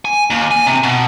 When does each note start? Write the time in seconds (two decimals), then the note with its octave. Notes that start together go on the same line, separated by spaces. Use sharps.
0.05 G#5
0.31 D#2
0.51 G#5
0.67 C3
0.83 B2